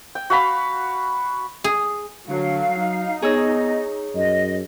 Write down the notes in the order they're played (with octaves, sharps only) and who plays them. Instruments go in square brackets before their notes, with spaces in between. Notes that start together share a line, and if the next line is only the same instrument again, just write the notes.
[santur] G5
F#4 F5 B5
[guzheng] G#4
[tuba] D3 [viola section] F#3 A3 [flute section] F5
[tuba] F#3 [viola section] D#4
[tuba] B3 [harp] G#4 C#5 E6 [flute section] D#5
[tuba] F#2 [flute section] D#5